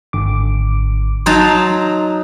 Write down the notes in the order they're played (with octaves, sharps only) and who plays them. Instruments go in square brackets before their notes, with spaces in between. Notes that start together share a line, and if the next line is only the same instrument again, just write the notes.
[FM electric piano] G#1 D3 D6
[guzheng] F#3 D#4 A5 [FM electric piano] C6